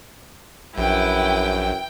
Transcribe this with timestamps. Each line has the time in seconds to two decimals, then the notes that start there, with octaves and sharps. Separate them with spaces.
0.78 A#1 F#2 E4 B4 G5